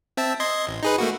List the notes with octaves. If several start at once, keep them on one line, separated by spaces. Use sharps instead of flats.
C4 E5 A5
D#5 C6 G#6
A1
D#4 G#4 B4
A3 A#3 F#4